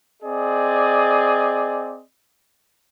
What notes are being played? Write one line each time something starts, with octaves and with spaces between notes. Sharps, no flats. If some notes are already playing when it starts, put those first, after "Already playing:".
C4 G#4 D5 D#5